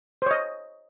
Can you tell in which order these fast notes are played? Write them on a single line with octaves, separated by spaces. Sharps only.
C5 C#5 D#5